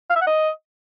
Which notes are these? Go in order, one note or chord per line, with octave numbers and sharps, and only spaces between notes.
F5
E5
F#5
D#5